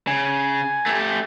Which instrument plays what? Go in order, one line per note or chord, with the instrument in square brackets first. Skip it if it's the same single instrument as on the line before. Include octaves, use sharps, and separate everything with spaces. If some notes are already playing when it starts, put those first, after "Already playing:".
[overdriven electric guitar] C#3 [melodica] G#5
[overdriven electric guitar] A3 G4